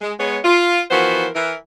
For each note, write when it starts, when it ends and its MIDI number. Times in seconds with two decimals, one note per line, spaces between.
0.01 0.13 56
0.20 0.39 56
0.20 0.39 59
0.20 0.39 73
0.45 0.82 65
0.91 1.27 52
0.91 1.27 53
0.91 1.27 59
0.91 1.27 66
0.91 1.27 70
0.91 1.27 72
1.35 1.54 52
1.35 1.54 70